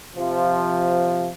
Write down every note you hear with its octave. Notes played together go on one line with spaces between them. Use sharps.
C3 F3